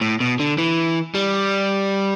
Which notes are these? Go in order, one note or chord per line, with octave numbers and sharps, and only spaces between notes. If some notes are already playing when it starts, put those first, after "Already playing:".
A2
B2
D3
E3
G3